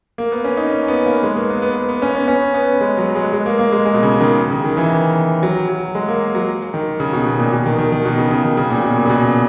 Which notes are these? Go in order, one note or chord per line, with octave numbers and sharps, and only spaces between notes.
A#3
B3
C#4
D#4
C#4
B3
A#3
G#3
A#3
B3
B3
B3
B3
C#4
B3
C#4
B3
G#3
F#3
G#3
G#3
A#3
A#3
G#3
G#3
B2
C#3
D#3
C#3
D#3
E3
F#3
F#3
G#3
A#3
F#3
D#3
C#3
B2
B2
A#2
B2
D#3
D#3
D#3
B2
C#3
C#3
D#3
C#3
A#2
B2
A#2
C#3
B2